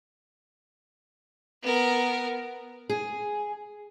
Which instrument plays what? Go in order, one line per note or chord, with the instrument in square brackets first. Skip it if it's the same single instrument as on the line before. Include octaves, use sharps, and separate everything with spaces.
[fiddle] B3 A#4
[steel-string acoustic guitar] G#4